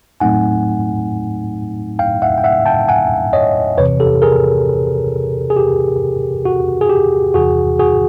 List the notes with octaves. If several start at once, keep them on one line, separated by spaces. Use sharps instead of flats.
A2 F#3 A3 C4 D#4 F#5 G#5
F5 G5
E5 F#5
G5
E5 F#5
G5 A5
F#5 G#5
C#5 D#5
E2 C3 E3 B4 C#5
G4 A4
G#4 A#4
G#4
G4
F#4
G#4
G4
E2 C3 E3 F#4 G#4
F#4 G#4